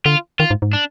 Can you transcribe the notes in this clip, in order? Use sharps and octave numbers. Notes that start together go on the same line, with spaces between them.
D3 F4
D#3 F4
G#2
G#2
D4